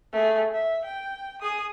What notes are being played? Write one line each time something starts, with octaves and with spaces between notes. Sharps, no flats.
A3 G#4
E5
G5
G#4 D#6